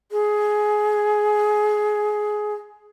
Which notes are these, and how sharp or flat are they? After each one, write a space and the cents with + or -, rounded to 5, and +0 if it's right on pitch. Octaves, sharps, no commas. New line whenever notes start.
G#4 +15